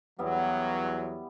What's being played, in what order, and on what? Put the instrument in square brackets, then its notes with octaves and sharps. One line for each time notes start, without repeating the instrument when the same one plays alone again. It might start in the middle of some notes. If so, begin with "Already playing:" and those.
[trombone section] E2 F#3 [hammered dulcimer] G3 B3 E4